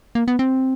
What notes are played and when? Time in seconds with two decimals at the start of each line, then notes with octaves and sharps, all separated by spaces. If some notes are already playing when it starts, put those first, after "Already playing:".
0.15 A#3
0.28 B3
0.39 C4